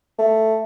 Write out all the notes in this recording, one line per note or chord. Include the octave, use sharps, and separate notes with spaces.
A3